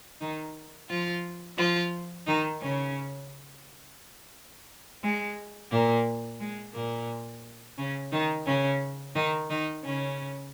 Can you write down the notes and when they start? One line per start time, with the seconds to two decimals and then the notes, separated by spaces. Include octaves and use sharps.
0.20 D#3 D#4
0.89 F3 F4
1.57 F3 F4
2.26 D#3 D#4
2.61 C#3 C#4
5.02 G#3
5.71 A#2 A#3
6.40 G#3
6.74 A#2 A#3
7.77 C#3 C#4
8.12 D#3 D#4
8.46 C#3 C#4
9.15 D#3 D#4
9.49 D#3 D#4
9.84 C#3 C#4